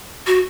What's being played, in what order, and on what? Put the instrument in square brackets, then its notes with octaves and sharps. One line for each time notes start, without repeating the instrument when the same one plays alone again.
[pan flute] F#4